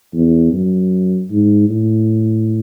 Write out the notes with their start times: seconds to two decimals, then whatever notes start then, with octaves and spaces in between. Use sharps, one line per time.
0.13 E2
0.52 F#2
1.30 G#2
1.69 A2